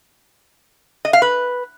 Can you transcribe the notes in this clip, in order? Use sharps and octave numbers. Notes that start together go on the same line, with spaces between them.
D#5
F5
B4